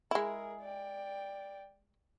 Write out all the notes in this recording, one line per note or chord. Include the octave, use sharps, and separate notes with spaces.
G#3 E4 G#4 A#4
D5 G5